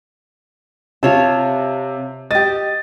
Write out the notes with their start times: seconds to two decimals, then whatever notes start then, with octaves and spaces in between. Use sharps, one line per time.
1.03 C3 F4 C#5 A5
2.31 G4 D#5 A6